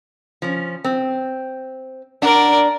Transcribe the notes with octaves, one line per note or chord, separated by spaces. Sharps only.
F3 C#4
C4
D4 A#4 D5 F#5